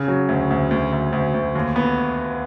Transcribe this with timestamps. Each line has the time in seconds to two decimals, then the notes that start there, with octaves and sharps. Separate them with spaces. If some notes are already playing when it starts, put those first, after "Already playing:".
Already playing: C#3
0.08 F#3
0.29 D2
0.50 D2
0.71 D2
0.92 D2
1.12 D2
1.34 D2
1.55 D#2
1.76 B3